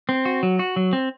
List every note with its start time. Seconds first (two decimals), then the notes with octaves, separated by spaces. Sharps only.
0.09 C4
0.25 F#4
0.43 F#3
0.59 F#4
0.76 F#3
0.93 C4